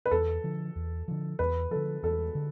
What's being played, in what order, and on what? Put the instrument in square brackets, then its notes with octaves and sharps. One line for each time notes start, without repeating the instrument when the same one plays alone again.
[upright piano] B4
[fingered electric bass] E2 [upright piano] A4
[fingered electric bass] D3 F3
E2
D3 F3
[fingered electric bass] E2 [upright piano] B4
[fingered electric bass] D3 F3 [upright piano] A4
[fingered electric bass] E2 [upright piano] A4
[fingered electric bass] D3